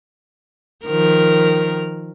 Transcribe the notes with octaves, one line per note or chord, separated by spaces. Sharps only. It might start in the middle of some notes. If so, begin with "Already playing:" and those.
D#3 F3 A#4